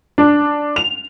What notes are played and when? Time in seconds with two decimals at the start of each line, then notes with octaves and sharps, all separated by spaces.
0.18 D4
0.76 F7